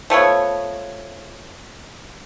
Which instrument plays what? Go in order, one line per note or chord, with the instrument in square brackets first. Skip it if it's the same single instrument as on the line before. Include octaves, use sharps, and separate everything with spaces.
[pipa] F3 A3 B3 C#5